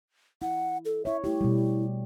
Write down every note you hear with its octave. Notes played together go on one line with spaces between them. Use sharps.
E4 F#5
A4
E4 C#5 E5
A3 E4 G4
B2 G3